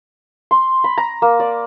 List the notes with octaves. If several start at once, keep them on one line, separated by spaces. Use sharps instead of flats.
C6
B5
A#5
A#3
D5